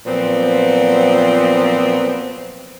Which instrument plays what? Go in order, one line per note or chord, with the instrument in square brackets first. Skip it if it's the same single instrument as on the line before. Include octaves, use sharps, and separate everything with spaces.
[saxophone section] A#2 F3 F#3 B3 C4